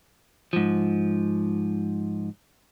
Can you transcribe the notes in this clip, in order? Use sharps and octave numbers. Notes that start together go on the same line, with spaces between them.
G#2 F3